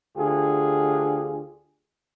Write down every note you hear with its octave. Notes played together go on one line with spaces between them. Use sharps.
D2 D3 F4 G4 G#4